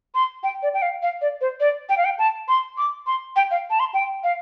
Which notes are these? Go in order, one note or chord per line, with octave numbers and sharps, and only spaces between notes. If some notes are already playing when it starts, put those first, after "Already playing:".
C6
G5
D5
G5
F5
F5
D5
C5
D5
G5
F5
G5
A5
C6
D6
C6
G5
F5
A5
C6
G5
F5